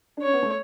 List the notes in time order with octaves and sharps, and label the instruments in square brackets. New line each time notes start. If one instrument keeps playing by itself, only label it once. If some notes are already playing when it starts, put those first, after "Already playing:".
[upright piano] D4
[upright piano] C#4 [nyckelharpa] C#5
[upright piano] B3
A3